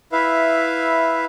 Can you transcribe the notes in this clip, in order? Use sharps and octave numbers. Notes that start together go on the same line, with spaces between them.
E4 B4 E5 F5